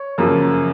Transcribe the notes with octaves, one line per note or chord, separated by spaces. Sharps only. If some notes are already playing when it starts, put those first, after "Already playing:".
Already playing: C#5
F#2 C#3 F3 A#3